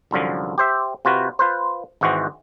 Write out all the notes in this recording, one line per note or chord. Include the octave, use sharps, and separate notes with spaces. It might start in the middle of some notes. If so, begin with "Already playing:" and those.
C2 F#2 D3 F3
G4 C5 E5
C3 F4 F#4 B4
F4 B4 C5
G#1 G#2 E3 F#4 C5